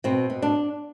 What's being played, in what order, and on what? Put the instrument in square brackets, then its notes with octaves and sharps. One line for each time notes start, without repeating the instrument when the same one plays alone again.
[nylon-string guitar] B2 C4
B2
D4